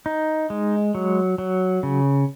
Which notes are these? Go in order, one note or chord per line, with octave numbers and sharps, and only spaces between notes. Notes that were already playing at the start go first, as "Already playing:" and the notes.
D#4
G#3
F#3
F#3
C#3